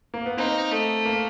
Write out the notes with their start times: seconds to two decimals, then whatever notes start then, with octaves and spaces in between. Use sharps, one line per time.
0.14 A#3
0.26 B3
0.37 A#3 C4 D#4
0.71 A3
1.06 A#3